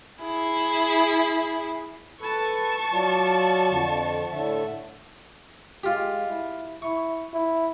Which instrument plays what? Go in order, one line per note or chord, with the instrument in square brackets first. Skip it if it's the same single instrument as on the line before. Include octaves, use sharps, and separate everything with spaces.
[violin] E4 G#4
[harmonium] A4 B4 [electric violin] A5 C#6
[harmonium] F#3 F4 D5
F2 D3
A2 D3 E5
[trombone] G#3 [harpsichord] F4 G4
[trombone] E4
[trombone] E4 [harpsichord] C#6
[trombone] E4